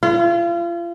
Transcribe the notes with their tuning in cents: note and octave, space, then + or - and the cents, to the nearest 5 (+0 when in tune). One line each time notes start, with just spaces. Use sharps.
F4 -35